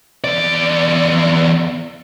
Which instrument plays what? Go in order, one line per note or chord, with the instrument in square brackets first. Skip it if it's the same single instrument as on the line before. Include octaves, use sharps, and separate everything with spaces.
[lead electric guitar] E2 D5